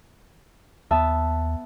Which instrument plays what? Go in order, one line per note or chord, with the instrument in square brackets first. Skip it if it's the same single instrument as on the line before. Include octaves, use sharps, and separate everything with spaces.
[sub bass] D#2 [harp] B3 E5 A5